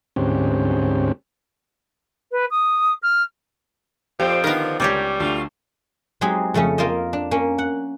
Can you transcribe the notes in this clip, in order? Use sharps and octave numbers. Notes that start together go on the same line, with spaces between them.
D2 G#2 C4 C#4 G4
B4
D#6
F6
F2 A#2 F3 C4 G4
D3 D#3 B3 A#4
C#2 G3 G4 C#5 D5
D2 A3 F4
F#3 G#3 C4 D#4 G4 G#4
F2 C#3 A3 C#4
A#3 F4 A#4 C5 D#5
D4
A#3 C#4
F#5